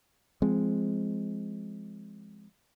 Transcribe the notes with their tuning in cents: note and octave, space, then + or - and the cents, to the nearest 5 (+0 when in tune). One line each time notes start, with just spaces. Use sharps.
F3 -25 G#3 +0 C4 +0